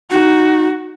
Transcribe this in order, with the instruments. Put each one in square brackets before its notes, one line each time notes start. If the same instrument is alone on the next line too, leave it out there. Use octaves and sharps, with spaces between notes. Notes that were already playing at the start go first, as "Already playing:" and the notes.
[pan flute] D#4 [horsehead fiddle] F#4